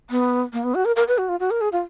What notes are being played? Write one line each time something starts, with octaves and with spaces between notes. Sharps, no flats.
B3
A#3
B3
F#4
A#4
A#4
B4
F#4
F4
F#4
A#4
G#4
F4